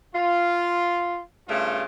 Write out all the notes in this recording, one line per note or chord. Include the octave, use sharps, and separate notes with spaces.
F4
G2 C#3 A3 F4